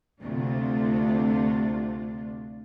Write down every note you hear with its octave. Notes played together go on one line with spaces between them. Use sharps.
D2 C3 A3 D4 F4